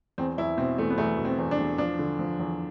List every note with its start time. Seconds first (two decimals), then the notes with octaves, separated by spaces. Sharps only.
0.18 E2 C4
0.38 E2 E4
0.57 B2 C4
0.78 E2 A3
0.90 B3
0.98 E2 A3
1.18 B2
1.25 C4
1.38 E2
1.51 D4
1.59 E2
1.78 F3 D4
1.99 D3
2.19 F3
2.39 E2